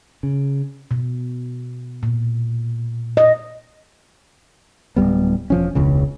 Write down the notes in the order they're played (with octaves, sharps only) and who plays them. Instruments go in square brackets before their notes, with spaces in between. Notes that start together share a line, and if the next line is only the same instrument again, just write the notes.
[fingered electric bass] C#3
[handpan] B2
A#2
D#5
[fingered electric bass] D1 G#2 G3 B3
E1 F3 C#4
E1 C#2 C#3